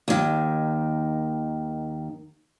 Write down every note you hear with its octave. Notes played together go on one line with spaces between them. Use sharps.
D#2 D#3